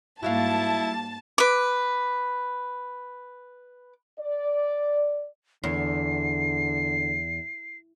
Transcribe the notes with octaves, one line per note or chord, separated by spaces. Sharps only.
G#2 G3 A#3 E4 F#4 E5 F5 A5
B4 D6
D5
E2 D3 C7